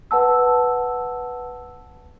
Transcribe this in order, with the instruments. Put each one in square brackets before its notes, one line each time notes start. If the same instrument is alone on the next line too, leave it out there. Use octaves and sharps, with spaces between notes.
[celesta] B4 F#5 A5 E6